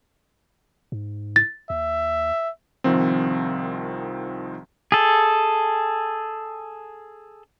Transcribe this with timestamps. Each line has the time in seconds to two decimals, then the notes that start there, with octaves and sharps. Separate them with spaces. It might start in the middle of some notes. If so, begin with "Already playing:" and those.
0.92 G#2
1.36 A6
1.70 D#2 E5
2.84 C2 D#3 F3 C4
4.92 G#4 A4